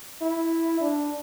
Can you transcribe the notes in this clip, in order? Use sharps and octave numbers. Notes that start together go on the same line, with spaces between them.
E4
D4